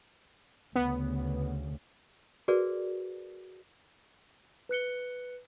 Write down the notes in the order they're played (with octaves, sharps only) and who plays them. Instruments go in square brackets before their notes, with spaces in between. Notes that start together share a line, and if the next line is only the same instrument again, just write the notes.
[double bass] D2 C#3 [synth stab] B3
[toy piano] F#4 G#4 A#4 B4 D5
[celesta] B4 F#6 C#7 G7